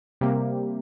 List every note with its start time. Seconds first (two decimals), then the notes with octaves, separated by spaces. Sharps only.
0.21 C3 G3 A#3 G4